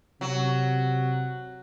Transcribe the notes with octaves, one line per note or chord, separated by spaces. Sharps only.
C3 F#3